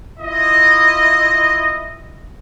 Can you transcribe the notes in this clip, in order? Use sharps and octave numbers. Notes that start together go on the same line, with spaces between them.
E4 F4 D#5